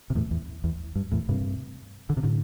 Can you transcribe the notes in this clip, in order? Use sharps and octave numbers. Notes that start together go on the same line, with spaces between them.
C3
E2 A2
E2
E2
G2
E2 A2
G2 C3
D3
C3
A2 D3